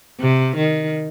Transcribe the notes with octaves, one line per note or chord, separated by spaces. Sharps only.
C3
D#3